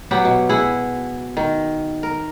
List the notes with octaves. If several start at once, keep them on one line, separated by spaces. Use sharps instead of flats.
F#3 B3 G4 F#5
B2
E4 G#4 F#5
D#3
A#4